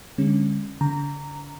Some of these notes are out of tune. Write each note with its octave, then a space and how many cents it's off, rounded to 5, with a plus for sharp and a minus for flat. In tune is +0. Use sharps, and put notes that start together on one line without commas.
D3 +0 G#3 -40 C#4 -20
D3 -40 A#5 -10